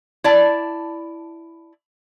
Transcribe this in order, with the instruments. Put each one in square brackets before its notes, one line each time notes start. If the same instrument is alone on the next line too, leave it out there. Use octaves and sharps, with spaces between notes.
[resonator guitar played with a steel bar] E4 D5 A5